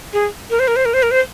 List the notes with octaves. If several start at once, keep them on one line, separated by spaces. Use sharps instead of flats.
G#4
A#4
C5
A#4
C5
A#4
C5
A#4
C5